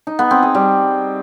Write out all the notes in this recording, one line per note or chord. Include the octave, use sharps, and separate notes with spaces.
D#4
B3
C4
G#4
G3